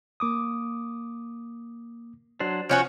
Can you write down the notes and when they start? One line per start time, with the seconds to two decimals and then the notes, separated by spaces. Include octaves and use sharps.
0.20 A#3 D6 D#6
2.40 F#3 D4 C5
2.69 F3 C#4 F#4 C#5